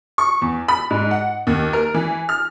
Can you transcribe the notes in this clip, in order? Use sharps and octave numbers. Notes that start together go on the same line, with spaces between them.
C#6
E2
B5
G#2
F#5
D#2
A#4
E3
F6